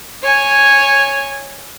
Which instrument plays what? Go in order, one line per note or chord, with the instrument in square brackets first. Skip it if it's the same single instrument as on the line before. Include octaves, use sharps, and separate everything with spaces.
[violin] C#5 G#5